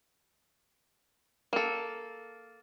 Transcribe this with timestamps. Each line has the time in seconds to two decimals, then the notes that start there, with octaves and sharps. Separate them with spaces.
1.53 A#3 A4